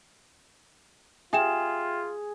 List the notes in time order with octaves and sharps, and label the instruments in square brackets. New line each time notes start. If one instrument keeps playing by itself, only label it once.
[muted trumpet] F4 [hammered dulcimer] G#4 [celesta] E5 G5 E7